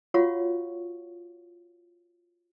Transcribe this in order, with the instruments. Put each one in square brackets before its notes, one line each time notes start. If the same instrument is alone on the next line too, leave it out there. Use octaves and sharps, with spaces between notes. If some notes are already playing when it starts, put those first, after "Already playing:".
[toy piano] F4 F#4 C#5 F5 F#5 C#6